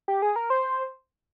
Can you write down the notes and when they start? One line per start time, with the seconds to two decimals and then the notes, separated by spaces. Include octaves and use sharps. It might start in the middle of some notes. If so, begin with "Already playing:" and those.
0.08 G4
0.22 G#4
0.36 A#4
0.50 C5